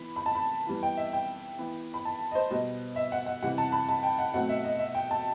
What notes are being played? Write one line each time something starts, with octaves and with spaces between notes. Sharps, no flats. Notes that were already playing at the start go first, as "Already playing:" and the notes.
Already playing: E3 B3 B5
B5
A5
B5
E3 G3 B3
G5
E5
G5
E3 B3
B5
A5
D#5
C5
B2 G3 B3 D#5
E5
F#5
F#5
C3 E3 G3 F#5
A5
B5
A5
G5
F#5
B2 F#3 A3 C4 F#5
E5
D#5
E5
G5
A5